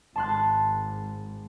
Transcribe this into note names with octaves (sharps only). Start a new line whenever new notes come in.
G#1 A5 C6 F#6